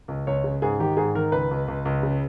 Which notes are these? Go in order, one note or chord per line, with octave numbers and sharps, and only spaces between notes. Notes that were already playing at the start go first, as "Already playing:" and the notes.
C#2
C#2 C#5
C#3
G#2 G#4
D#3 G4
G#2 G#4
D#3 A#4
C#2 B4
C#2
C#2
C#2
C#3